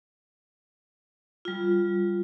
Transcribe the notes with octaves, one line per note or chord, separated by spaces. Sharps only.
G3 F4